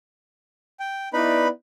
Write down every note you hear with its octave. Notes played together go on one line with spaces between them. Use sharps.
G5
B3 D#4 E4 B4 D5 B5